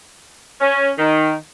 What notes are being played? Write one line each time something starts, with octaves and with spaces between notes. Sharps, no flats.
C#4
D#3